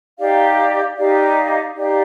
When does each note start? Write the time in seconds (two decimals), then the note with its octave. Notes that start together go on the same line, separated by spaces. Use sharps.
0.17 D#4 G4 D5 F5
0.95 D#4 G4 D5 F5
1.74 D#4 G4 D5 F5